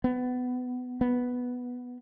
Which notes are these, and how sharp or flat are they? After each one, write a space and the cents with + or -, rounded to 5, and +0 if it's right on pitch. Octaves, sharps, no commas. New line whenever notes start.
B3 +20
B3 +0